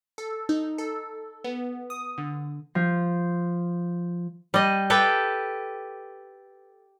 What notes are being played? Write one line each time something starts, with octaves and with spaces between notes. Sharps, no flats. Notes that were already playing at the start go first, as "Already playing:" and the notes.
A4
D#4
A4
B3
D#6
D3
F3
G3 D#5
G4 A4 B4 G5